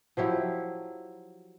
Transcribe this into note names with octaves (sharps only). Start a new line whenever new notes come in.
F3 F#3 E4 G4